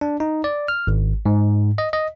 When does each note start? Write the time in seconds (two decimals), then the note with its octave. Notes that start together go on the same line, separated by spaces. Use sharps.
0.01 D4
0.20 D#4
0.44 D5
0.68 F6
0.87 G#1
1.26 G#2
1.78 D#5
1.93 D#5